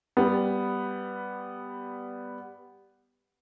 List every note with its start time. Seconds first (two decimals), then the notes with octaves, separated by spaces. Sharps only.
0.17 G3 B3